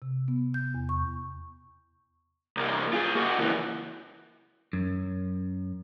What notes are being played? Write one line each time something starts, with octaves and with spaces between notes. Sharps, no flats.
C3
B3
G6
E2
C#6
C2 A#3
F4 G#4
A#3 F#4
C#2 E3
F#2